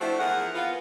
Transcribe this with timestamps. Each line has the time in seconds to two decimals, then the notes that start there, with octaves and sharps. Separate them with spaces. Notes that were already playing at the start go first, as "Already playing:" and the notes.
0.01 F3 A3 C4 D4 E4 F#4
0.20 E2 F3 G#4 A#4 F#5
0.55 B3 F4